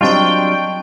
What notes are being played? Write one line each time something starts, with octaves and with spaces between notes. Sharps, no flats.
F#3 G3 C4 D4 F4 D#5 G5 C#6